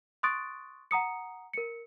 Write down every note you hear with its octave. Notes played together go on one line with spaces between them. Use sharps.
C6 C#6 D#6 F#6 A6 D7
F#5 A#5 D#6 C#7
A#4 C#7